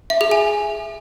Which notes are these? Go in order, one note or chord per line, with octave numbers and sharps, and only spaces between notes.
E5
G#4
G#5